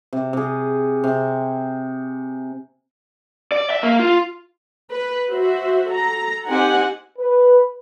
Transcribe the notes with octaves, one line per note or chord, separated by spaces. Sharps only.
C3
C3 G#4
C3
D5
E5
A#3
F4
B4
F#4 C5 E5
A4 A#5
C4 D#4 G4 C5 F#5 G#5
B4